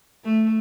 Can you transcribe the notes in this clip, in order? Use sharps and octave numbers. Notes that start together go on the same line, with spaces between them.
A3